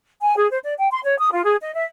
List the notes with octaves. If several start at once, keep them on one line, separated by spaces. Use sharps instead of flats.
G#5
G#4
C5
D5
G5
C6
C#5
D#6
F4
G#4
D#5
E5